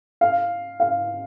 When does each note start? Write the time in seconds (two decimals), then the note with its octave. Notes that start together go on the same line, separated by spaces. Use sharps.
0.21 F5
0.80 F5